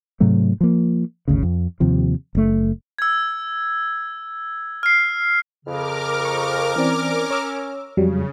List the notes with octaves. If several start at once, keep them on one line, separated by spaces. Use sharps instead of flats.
G#2 C3 F#3 A3
F3 A#3
G#1 D2 C#3
F2
D#2 C3 F3
F#1 A3
E6 G#6
F6 C7
F2 C#3 A#4 D6 F6
C#6
E3 C4 C#4 D5
C#5 E6
F2 C#3 F#3 G3